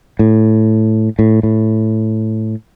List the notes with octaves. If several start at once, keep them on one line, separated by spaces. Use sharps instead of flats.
A2
A2
A2